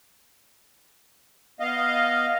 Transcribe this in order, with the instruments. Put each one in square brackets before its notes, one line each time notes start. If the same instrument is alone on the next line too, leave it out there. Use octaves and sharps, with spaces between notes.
[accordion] B3 D#5 F5